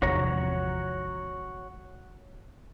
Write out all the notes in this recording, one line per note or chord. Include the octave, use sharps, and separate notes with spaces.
G#1 E2 C3 F3 F#4 C#5 A#5